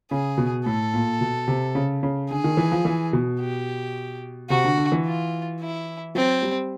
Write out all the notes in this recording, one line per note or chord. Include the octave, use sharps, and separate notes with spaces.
C#3 G#4
B2
A2 A4
A#2
B2
C3
C#3
C#3
D3 G#4
D#3
E3
F3
E3
B2
G4
C3 F#4
D3
D3
E3
F4
E4
F#3 C4
G3